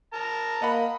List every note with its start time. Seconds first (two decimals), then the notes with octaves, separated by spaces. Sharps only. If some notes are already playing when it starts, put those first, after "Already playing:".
0.13 A#4 A5 A#5
0.62 A#3 D#5 F#5 B5